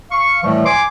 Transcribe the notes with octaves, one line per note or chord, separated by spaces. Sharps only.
F5 C#6
A2 E3 F3 G3 A3
G#5 C6 D6